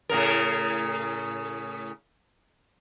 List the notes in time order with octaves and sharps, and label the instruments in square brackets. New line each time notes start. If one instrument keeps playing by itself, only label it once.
[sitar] A2 C#3 A#4